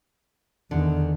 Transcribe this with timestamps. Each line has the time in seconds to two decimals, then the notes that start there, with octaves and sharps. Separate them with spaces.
0.71 E2 D3 D#3